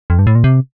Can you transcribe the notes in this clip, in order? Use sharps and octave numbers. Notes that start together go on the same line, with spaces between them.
F2
G2
A2
A#2
C3